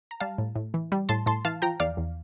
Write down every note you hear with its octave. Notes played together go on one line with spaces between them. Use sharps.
A#5
G3 F5 A5
A2
A2
E3
G3
A2 A5 C6
A2 A5 C6
E3 F5 A5
F3 G5 A#5
E2 D5 F5
E2